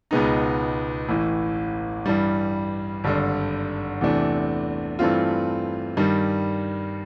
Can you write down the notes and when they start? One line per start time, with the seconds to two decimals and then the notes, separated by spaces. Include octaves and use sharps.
0.11 C#2 B2 G#3 B3 D#4
1.09 A1 A2 E3
2.06 G2 E3 G3
3.04 G#1 G2 D3
4.01 E2 C3 E3 A3 D4
4.99 G2 E3 A3 C4 F4
5.97 G2 D#3 G3